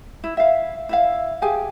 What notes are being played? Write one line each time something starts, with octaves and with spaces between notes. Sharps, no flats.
E4
E5 F5
E4 E5 F5
G4 G#4 F5 G#5